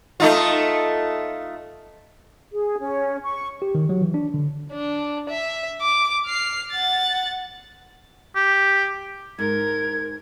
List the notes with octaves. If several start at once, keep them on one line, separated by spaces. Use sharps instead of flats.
A3 D#4 F4
G#4
C#4
C#6
G4
D#3
F#3
E3
D4
D3
D4
E5
D6
F6 C7
F#5 A6
G4
G#2 A#4 G#6